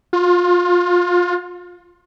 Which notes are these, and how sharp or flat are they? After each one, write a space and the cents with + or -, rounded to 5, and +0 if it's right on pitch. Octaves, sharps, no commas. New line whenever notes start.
F4 +25